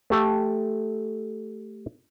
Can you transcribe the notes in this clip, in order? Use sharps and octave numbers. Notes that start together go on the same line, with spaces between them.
A3 G4 A4